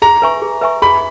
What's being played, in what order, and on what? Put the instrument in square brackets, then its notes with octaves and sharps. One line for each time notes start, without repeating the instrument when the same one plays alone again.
[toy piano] G#4 [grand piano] A#5
[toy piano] B4 E5 G#5 C#6
G#4
B4 E5 G#5 C#6
[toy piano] G#4 [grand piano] B5